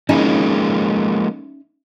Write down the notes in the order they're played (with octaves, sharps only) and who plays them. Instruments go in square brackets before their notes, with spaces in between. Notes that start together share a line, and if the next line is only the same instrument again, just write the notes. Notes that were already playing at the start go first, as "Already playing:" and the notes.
[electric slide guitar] F3 G#3 A#3 [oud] C#4 D#4 E4